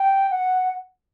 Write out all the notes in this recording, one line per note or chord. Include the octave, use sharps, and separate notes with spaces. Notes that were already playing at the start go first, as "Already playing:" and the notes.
Already playing: G5
F#5